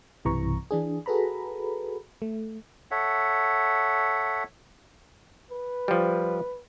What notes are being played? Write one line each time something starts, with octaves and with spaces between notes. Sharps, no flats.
B1 G2 C3 E3 A#5 C#6
E3 D4 G#4
F#4 G#4 A4 B4 A#5 B5
A3
A4 C#5 E5 F#5
B4
F3 G3